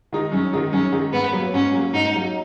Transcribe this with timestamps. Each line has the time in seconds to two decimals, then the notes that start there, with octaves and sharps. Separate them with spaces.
0.13 D#3 G#3 D#4
0.32 F#2 C#4
0.53 D#3 G#3 D#4
0.72 F#2 C#4
0.92 D#3 G#3 D#4
1.13 G#2 B3
1.33 F#3 A#3
1.54 G#2 C#4
1.73 F#3 A#3
1.93 G#2 D#4
2.14 F#3 A#3